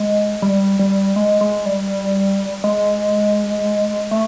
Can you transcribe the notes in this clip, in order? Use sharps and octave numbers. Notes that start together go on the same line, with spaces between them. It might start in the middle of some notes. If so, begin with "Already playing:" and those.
Already playing: G#3
G3
G3
G#3
G#3
G3
G#3
A3